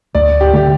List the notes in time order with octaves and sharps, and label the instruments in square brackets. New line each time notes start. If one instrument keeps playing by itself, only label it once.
[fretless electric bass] D2 [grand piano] D5
[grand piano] G4
[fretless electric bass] D3 A3 [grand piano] G4